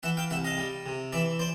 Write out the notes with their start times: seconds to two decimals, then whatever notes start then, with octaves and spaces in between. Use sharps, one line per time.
0.03 E3 E5 F#5
0.17 F5 G5
0.30 C2 E5 F#5
0.45 D#5 F5
0.57 G3
0.86 C3
1.12 E3 D5 E5
1.39 C5 D5